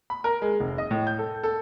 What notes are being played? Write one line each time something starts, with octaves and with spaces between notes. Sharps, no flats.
B5
A#4
G#3
F1
D#5
A2
G6
A4
A4